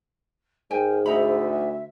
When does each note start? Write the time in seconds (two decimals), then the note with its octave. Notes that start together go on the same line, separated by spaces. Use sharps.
0.71 G#2 A#4 G5 G#5
1.06 D2 D#4 E5 A#5 B5